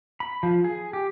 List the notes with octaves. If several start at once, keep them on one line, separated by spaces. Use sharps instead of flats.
B5
F3
G#4
G4